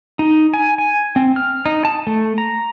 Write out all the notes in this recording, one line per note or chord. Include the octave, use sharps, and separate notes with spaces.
D#4
G#5
G#5
C4
F6
D#4
A5
A3
A#5